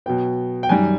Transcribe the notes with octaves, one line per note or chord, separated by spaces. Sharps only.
B2 F#3 B3 G5
G5
F#2 D#3 G3 G#5